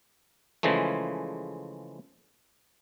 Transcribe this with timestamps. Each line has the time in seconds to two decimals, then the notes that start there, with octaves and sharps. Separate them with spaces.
0.63 C#3 E3 F3 G#3 A3